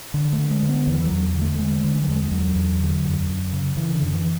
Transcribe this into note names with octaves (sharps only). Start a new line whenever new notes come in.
D3
A3
D3
G#3
D3
B3
E2 E3
E3
F#3
E2
D3
A3
D3 G#3
D3
G#3
F#3
E2 G#3
G#3
E2 F#3
E2
D3
F#2
F#2
C#3
C#3 E3
D3
F#2
E3